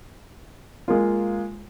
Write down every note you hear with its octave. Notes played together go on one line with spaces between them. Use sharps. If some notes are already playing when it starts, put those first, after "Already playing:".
G#3 A#3 F4